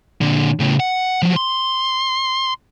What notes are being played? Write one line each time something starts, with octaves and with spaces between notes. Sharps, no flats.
A#2 D3
A2 C#3
F#5
F3 F#3
C6